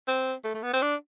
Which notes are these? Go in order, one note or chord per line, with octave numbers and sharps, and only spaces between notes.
C4
A3
A3
B3
C4
D4